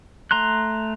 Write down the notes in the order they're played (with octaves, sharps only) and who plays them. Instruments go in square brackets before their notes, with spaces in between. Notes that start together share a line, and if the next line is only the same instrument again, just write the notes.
[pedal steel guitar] A3 A#5 C6 F#6